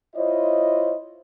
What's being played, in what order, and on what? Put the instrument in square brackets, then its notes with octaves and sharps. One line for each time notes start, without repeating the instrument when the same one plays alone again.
[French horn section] E4 F4 C5 C#5 D#5